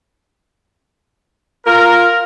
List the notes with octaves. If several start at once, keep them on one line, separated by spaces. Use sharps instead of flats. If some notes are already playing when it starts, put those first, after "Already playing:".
F4 A#4